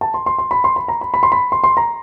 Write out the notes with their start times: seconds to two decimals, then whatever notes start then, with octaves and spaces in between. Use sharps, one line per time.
0.01 A5
0.14 C6
0.26 C6
0.38 C6
0.51 B5
0.64 C6
0.76 B5
0.88 A#5
1.01 B5
1.14 B5
1.23 C6
1.32 B5
1.52 C6
1.64 C6
1.77 A#5